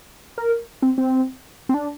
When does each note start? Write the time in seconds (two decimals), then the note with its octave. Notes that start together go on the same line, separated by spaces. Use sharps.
0.38 A#4
0.82 C4
0.98 C4
1.69 C4
1.74 D4